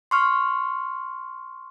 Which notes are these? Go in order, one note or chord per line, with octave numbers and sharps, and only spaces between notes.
C6 C#6 F6